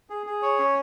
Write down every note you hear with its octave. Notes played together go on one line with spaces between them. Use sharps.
G#4
G#4
C#5
C#4